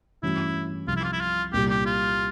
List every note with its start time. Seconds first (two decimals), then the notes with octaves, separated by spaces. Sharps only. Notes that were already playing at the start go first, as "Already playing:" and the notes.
0.23 G2 E3 A3 C#4 E4 F#4
0.87 C2 C3 F3 F4
0.97 E4
1.04 F4
1.13 E4
1.21 F4
1.53 C2 A#2 G3 G4
1.70 G4
1.86 F4